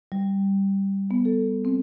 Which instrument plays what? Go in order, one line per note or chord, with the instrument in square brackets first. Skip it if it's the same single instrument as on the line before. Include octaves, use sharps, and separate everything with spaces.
[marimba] G3
B3
A4
C4